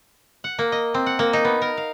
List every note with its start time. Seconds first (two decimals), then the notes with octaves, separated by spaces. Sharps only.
0.44 F#5
0.59 A#3
0.72 D#5
0.94 C4
1.06 F#5
1.19 A#3
1.33 D#4
1.45 B3
1.62 A#4
1.77 F5